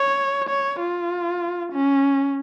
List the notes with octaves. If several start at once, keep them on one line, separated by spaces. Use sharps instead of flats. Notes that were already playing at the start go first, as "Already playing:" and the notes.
Already playing: C#5
C#5
F4
C#4